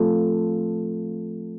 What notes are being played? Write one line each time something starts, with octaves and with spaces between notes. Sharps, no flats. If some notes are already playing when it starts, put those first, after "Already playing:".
Already playing: F3 A3 C4 F4 A4